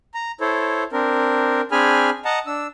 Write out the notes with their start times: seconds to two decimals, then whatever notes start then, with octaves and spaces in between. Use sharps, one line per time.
0.14 A#5
0.41 E4 A4 C5 C#5
0.93 C4 D4 A#4
1.72 C4 D4 G#4 G#5 B5 F6
2.25 D#5 F#5 A5 A#5
2.47 D4 E6